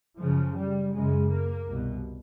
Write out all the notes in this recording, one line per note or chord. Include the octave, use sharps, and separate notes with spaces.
F#2 C#3 F3
G3
F#2 C#3 G#3
A#3
C2 B2